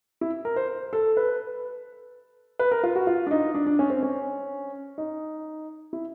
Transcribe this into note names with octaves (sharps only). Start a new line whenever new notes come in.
E4
A#4
C5
A4
B4
B4
A#4
F4
F#4
F4
D4
D#4
D4
D4
C#4
C4
C#4
D#4
E4